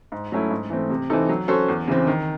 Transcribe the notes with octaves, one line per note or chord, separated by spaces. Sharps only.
G#2
F#3 A3 C#4 E4
G#2
E3 A3 C4
C3
E3 C4 D#4 A4
F#3
C#4 F#4 A4 C5
E2
C#3 E3 C4
D#3